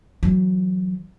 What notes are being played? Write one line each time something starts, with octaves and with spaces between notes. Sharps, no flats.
E3 F#3